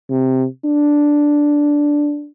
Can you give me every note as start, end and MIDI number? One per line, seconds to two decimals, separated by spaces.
0.10 0.46 48
0.65 2.28 62